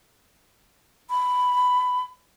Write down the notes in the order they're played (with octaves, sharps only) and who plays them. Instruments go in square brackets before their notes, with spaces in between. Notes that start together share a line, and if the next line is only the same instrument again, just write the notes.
[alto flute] B5